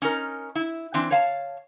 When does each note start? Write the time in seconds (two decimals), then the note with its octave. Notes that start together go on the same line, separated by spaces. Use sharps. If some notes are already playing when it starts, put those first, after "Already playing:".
0.02 C#4 D#4 A#4
0.55 E4
0.94 E3 C4 D4
1.11 C#5 F5 A5